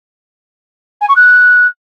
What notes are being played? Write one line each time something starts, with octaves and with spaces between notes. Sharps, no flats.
G#5
C#6
F#6